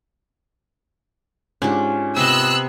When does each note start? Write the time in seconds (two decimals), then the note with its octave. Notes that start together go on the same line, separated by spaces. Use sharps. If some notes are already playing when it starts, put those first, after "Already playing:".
1.62 G#2 C#4 D4 F4 G4
2.17 C3 B3 D#5 E6 F#6